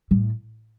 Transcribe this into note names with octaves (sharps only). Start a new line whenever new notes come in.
A2